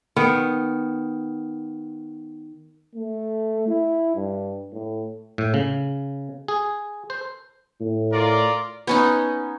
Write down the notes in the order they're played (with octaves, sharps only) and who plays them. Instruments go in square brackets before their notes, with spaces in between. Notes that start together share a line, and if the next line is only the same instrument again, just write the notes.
[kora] D#3 B3
[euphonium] A3
E4
G2
A2
[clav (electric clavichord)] A2
C#3
G#4
C5
[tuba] A2
[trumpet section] F4 A#4 D5
[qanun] B3 C#4 D#4